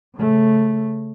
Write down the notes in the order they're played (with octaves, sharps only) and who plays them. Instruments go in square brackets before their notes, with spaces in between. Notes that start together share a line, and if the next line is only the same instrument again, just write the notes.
[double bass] C#3 A3